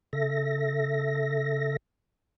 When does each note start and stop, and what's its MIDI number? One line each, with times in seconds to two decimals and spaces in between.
0.13 1.77 49
0.13 1.77 69
0.13 1.77 76
0.13 1.77 94